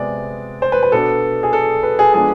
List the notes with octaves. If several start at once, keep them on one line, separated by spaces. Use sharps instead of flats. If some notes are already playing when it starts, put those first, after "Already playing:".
Already playing: C3 G#3 B3 D5
C5
B4
B4
B2 B3 D4 A4
G#4
A4
B4
G#4
F3 G#3 B3 D4 G#4